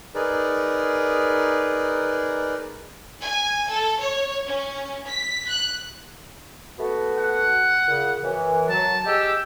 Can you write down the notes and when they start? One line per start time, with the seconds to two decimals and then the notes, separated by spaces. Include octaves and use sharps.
0.15 D#4 G#4 A#4 B4 D5
3.22 G#5
3.71 A4
4.00 C#5
4.46 C#4
5.07 B6
5.48 F#6
6.79 A3 B3 F#4
7.18 F#5
7.86 A#2 C#3
8.23 F#2 E3
8.70 F#3 A5
9.06 G4 G#4 D#5 E6